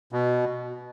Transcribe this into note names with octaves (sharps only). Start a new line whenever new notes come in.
B2